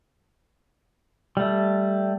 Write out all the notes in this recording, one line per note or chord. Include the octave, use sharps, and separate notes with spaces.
G3 A3